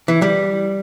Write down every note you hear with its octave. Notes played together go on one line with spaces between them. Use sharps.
E3
G3